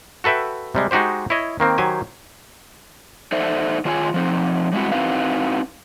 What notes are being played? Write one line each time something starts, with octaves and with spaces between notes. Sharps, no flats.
F#4 A4 B4 E5 G5
C3 G3 G#3
G#3 D#4 F#4 G4 C5
E4 C#5 D#5
D#3 A#3 C4
D#3 F#3 G4 C5 G#5
D#4 A4 C5 D5 E5
D#3 D4 F4 G#4 C#5 G#5
F3 C4 D#4
G3 G#3 C4 E4 F#4
C4 D#4 E4 F#4 B4 F5